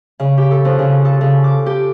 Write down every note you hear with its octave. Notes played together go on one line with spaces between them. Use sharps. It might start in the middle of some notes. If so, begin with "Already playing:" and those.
C#3
G4
A4
F2
C#3
A4
C#3
D6
G4